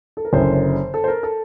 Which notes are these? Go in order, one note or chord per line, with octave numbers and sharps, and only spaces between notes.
A4
A#4
F#1 F#2 D3 C5
A4
C5
A#4
A4